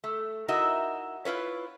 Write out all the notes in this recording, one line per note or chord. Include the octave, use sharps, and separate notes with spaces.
A3
D#4 E4 F#4 A#4 D#5 E5
E4 F4 B4 C#5